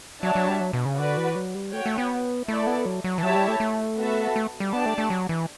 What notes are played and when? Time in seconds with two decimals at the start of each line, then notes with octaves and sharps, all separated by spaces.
0.23 F#3 D4 F#4 C#5 E5 A5
0.35 F#3
0.48 G3
0.60 F#3
0.73 B2
0.85 C#3
0.97 D3 F#4 B4 D5
1.17 E3
1.35 F#3
1.55 G3
1.73 A3 F#4 C#5 G5
1.86 A3
1.98 B3
2.48 A3 E4 A4 D5
2.67 B3
2.85 F#3
3.04 F#3
3.18 E3
3.23 F#3 E4 G4 C#5 E5 A5
3.35 G3
3.48 A3
3.60 A3
3.98 B3 F#4 A4 E5 A5
4.36 A3
4.60 G3
4.73 B3 D4 G4 D5 A5
4.86 A3
4.98 A3
5.10 F#3
5.29 E3